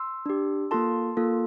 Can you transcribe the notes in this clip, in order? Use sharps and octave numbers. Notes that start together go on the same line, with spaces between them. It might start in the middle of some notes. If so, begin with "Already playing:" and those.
Already playing: C6 E6
D4 G4
A#3 F4 A4 A5 C6
A#3 F4 A4